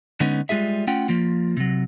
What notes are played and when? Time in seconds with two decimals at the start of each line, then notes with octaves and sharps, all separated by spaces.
0.20 D3 G#3 B3 C#4 D#4
0.49 G3 G#3 F4 G#4 E5
0.87 A3 C#4 F4 F#5 G5
1.08 F3 A#3 F4
1.57 C3 F#3